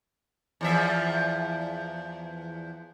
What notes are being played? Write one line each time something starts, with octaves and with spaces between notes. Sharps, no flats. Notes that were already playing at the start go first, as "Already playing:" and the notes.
E2 F3 E5